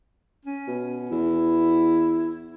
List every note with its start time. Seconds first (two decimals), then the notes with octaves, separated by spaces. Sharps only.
0.45 C#4
0.68 B2
1.11 E2 E4